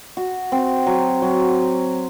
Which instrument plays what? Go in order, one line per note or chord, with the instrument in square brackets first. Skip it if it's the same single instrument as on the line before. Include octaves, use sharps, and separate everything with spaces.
[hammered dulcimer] F#4
C4
F#3
F#3